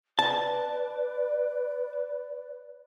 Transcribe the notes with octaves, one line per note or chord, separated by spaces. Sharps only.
B4 D5 A5